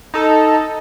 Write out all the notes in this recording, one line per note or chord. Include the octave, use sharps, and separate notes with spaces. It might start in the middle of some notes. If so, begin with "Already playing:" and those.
D#4 A4